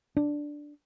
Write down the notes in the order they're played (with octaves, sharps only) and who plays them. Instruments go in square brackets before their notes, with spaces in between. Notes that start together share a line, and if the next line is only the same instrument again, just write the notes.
[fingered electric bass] D4